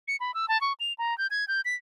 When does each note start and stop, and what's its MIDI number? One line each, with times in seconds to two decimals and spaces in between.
0.08 0.16 97
0.20 0.34 83
0.34 0.48 88
0.48 0.60 81
0.61 0.73 85
0.80 0.93 101
0.98 1.16 82
1.18 1.27 91
1.31 1.47 92
1.48 1.61 91
1.65 1.75 95